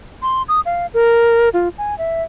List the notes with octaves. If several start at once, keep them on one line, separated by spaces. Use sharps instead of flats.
C6
D#6
F5
A#4
F4
G#5
E5